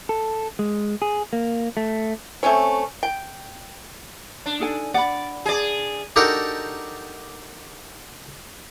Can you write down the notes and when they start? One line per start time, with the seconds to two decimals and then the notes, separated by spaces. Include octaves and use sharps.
0.09 A4
0.59 G#3
1.02 G#4
1.33 A#3
1.77 A3
2.43 A3 C4 C#4 C#5
3.03 G5
4.46 D4
4.60 D#4 A4 G#5
4.94 D5 F#5 B5
5.46 G#4 D5
6.16 D4 D#4 F#4 G4 A4 A#4